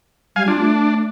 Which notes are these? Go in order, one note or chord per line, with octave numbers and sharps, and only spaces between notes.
G3 F5 G#5
D4 F4
A3